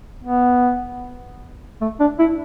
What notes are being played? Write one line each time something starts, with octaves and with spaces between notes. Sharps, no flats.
B3
A3
D4
E4